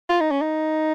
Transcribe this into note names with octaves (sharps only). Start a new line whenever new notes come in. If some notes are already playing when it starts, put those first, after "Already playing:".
F4
D#4
C#4
D#4